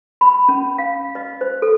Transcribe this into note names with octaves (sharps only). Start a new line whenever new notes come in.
B5
C#4
F5
D#5
C5
A4